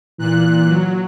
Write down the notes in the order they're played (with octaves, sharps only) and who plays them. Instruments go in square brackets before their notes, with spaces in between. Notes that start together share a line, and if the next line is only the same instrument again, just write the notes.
[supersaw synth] A#2 F#6 [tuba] E3
[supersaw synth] F#3